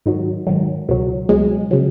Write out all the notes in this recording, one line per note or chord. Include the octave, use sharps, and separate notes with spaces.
G#2 D#3 F#3
G#2 D#3 F#3
C#2 B2 F#3
C#2 B2 F#3 G#3
C#3 F#3